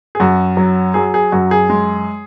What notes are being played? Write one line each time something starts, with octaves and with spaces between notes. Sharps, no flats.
G#4
F#2 F#4
F#3
F#3 G#4
G#4
F#2 F#4
G#4
G#3